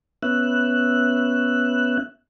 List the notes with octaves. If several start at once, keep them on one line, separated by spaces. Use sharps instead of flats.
B3 C#4 E5 F#6